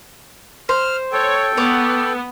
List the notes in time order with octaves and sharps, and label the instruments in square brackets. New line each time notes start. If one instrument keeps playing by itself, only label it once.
[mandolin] C5 [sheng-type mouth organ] F6
[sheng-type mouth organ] A4 G5 [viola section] C#5
[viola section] B3 [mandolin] C#5 D6